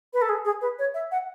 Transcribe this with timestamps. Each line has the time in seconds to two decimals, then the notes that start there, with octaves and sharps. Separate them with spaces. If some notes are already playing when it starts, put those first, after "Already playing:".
0.13 B4
0.22 A4
0.29 G#4
0.45 G#4
0.61 B4
0.79 C#5
0.94 E5
1.12 F#5